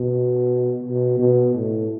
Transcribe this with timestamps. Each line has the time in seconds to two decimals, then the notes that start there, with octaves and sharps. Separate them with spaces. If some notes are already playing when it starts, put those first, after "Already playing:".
Already playing: B2
0.83 B2
1.19 B2
1.55 A2